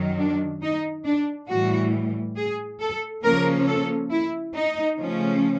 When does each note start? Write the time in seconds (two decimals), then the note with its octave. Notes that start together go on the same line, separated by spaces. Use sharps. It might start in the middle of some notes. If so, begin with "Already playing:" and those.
Already playing: F#2 D#3 F#3
0.18 D4
0.62 D#4
1.05 D4
1.49 A2 E3 G3 F#4
2.36 G#4
2.80 A4
3.24 C#3 F3 A#3 C#4 A#4
3.67 A4
4.11 E4
4.55 D#4
4.98 C#3 F3 A3 C#4